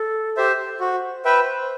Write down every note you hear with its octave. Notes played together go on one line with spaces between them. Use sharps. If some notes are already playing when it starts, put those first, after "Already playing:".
Already playing: A4
G4 C5 E5
F#4 C5
B4 E5 G5